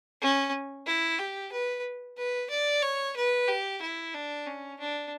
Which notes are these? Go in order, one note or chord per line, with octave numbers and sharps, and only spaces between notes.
C#4
E4
G4
B4
B4
D5
C#5
B4
G4
E4
D4
C#4
D4